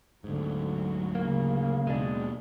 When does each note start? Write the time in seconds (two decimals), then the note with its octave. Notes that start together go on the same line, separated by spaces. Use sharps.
0.24 D2 G#2 D3 F#3
1.15 C#3 A#3
1.87 D#2 B2 G#3 D4